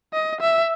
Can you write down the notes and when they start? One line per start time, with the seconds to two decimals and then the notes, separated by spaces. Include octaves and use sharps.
0.13 D#5
0.41 E5